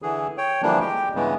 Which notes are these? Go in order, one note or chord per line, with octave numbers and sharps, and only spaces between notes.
D3 E3 G#4
C#5 G5
D3 E3 F3 G3 A#3 D4
G#3 G4 G5
G2 C#3 E3 G#3 B3